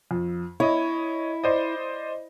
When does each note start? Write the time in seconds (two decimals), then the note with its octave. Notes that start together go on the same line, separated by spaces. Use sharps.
0.11 F2
0.60 E4 C#5 D#5
1.44 C5 D5 D#5